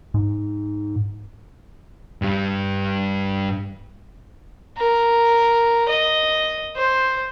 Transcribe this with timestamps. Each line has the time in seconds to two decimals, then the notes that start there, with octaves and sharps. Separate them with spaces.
0.14 G#2
2.22 G2 G3
4.77 A#4
5.89 D#5
6.76 C5